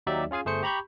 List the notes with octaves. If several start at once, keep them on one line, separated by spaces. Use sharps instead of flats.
D#2 F#3 D#4 G4 D5 E5
C#4 F4 G#4 F5 G#5
G1 A3 G#4 C5 C#7
G4 A#5 B5 C#6 G6